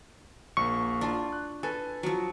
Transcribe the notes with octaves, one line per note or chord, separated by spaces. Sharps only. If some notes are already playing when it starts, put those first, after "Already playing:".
A#1 A#3 C#6
D4 F4
F#6
A4 B4 G#5
F3 F#3